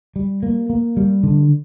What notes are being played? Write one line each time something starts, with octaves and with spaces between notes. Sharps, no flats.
G3
A#3
A#3
G3
D3